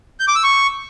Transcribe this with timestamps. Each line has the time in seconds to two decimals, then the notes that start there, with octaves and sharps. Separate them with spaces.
0.20 G6
0.28 D6
0.36 E6
0.43 C#6